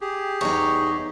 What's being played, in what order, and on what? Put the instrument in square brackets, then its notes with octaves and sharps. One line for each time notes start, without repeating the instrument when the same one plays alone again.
[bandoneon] G4 G#4
[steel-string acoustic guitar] E2 D#4 [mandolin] C#5